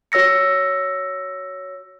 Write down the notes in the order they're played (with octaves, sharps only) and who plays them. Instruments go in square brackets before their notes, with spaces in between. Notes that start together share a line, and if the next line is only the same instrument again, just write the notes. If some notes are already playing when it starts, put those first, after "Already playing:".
[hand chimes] F#4 C#5 E6 A#6 C#7